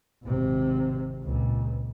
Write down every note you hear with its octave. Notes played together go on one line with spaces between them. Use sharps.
G#1 C3
C#2 A#2